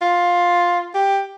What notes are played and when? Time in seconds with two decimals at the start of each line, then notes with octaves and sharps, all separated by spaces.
0.01 F4
0.94 G4